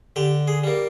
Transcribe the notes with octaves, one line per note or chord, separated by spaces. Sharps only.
D3 G4
G#4
G3 A#3